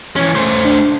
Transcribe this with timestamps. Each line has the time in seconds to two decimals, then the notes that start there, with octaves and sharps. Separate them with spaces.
0.16 E3 C#4
0.35 A3 C5
0.65 D4